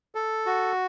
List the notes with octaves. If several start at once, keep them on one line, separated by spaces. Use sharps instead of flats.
A4
F#4